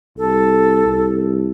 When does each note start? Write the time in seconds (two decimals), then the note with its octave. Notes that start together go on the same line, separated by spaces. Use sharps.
0.18 C2 A4
0.86 C2